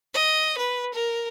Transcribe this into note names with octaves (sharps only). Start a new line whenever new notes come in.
D#5
B4
A#4